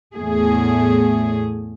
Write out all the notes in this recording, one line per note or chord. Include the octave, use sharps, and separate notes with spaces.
E2 A2 A3 G#4